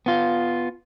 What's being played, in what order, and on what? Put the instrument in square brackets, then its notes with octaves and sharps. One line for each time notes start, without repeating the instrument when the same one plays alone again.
[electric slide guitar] B3 F4